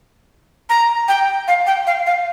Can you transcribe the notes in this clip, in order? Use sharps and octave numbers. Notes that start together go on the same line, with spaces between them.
A#5
G5
F5
G5
F5
F5